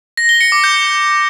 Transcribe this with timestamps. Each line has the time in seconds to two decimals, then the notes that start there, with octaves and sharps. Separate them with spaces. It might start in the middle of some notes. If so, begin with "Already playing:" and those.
0.17 A#6
0.29 G7
0.41 C#7
0.52 D6
0.64 G6